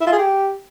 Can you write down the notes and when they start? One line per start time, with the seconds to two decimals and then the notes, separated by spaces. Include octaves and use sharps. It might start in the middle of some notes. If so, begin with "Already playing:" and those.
0.01 E4
0.07 F4
0.13 G#4
0.18 G4